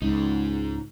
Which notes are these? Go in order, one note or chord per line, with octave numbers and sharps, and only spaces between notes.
C#2 G#2 D#4